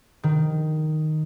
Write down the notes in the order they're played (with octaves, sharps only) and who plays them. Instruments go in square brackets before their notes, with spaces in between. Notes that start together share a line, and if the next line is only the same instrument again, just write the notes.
[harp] D#3